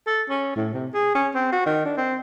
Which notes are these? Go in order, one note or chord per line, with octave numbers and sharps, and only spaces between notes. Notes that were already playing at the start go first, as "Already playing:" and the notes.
A4
C#4
A2
C3
G#4
C#4
C4
F#4
D#3
D4
C4